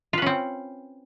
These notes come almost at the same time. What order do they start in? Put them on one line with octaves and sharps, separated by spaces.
F4 B4 C#4 C4